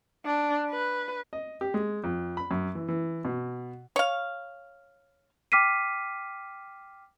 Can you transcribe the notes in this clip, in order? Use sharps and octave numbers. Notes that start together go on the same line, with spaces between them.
D4
B4
D#5
G4
G#3
F2
B5
F#2
E3
E3
B2
C#5 F5
G5 D6 F6 B6 C7 D#7